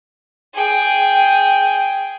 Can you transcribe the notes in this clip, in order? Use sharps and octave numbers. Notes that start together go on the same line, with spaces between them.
G#4 G5